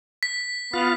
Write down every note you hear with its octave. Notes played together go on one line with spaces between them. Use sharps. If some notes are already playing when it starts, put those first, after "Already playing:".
B6
B3 F4 F5